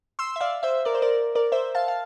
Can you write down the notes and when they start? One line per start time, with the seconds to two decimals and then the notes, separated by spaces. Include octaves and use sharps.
0.19 C6 E6
0.36 E5
0.41 D5 F5
0.63 C5 E5
0.85 A#4 D5
0.95 C5
1.02 A#4 D5
1.35 A#4 D5
1.52 C5 E5
1.75 F5 A5
1.88 F5